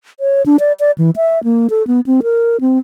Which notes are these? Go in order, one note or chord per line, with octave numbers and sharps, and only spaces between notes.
C#5
D4
D5
D5
E3
E5
A#3
A4
B3
C4
A#4
C4